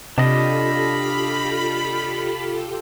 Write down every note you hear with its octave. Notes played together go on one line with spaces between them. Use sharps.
C3 D4 F4 G4 A4 D#5 F5 B5